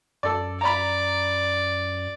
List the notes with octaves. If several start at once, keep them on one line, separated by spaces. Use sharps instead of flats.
F#2 A4 D5
D5 A#5 B5